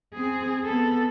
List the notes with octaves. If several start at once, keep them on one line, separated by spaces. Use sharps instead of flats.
C4 G#4
B3 A4